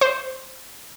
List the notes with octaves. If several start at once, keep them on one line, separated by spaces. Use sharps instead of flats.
C5